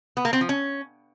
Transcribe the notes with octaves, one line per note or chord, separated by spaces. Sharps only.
B3
A#3
C4
F3
C#4